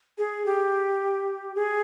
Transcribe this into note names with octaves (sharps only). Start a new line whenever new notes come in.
G#4
G4
G#4